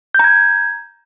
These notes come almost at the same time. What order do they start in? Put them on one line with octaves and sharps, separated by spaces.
G6 A#5 G#6